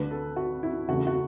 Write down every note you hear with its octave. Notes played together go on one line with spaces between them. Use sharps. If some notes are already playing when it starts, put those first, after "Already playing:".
Already playing: D2 D3 A3 B4
A4
F#4
E4
E2 C#3 E3 A3 F#4
F#4